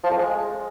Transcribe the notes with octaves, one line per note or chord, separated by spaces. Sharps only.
F3
F2
G#3